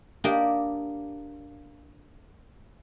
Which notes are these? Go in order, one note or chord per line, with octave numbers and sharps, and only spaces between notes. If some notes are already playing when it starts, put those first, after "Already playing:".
A#3 D4 G4 D#5